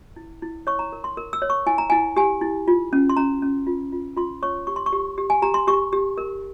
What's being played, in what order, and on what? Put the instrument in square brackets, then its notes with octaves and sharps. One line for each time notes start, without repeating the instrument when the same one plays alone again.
[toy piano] E4
E4
C#5 C#6
A#5
A#4
C6
A#4
E6
C#5
C#6
E4 G#5
A#5
E4 G#5
G4 G#5
E4
F4
C#4
C6
C#4 A#5
C#4
F4
F4
F4 C6
C#5 C#6
G4 C#6
C6
C#6
G4
G4
G#5
G4 A#5
C6
G4 C#6
G4
A#4